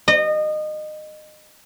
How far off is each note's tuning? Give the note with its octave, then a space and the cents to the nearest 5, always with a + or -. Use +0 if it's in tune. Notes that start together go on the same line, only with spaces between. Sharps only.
D#5 -25